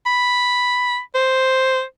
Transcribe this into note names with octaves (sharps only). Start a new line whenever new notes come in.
B5
C5